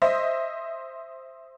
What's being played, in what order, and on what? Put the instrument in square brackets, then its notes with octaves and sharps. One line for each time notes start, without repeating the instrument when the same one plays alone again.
[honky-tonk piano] C5 D#5 E5